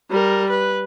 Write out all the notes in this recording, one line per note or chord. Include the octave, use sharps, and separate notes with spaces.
G3 A#4
B4